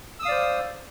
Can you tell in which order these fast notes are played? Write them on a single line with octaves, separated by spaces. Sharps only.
E6 D#6 F5 D5 C5